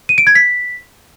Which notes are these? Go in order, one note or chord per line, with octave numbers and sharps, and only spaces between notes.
D#7
D7
G#6
B6